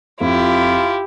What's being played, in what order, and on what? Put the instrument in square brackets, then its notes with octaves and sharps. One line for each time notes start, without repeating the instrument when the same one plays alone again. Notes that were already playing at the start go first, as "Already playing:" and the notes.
[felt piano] F2 [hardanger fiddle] E4 G4 [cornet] F4